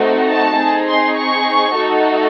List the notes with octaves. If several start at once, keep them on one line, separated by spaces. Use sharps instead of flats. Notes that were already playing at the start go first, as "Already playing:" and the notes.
Already playing: A3 C4 D#4 F#4
A5
C4 D#4 G#4
C6
C#6
A3 D#4 F#4 A4